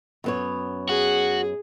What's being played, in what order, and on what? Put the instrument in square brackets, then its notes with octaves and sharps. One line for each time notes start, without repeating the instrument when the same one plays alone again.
[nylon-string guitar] F#2 B3 C#5
[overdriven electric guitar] F#4 [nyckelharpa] G#4